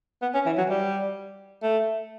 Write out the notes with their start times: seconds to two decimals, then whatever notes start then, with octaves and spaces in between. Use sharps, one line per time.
0.22 B3
0.34 C#4
0.46 E3
0.58 F#3
0.70 G3
1.63 A3